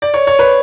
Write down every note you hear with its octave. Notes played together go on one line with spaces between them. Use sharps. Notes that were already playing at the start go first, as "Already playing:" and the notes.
D5
C#5
C#5
B4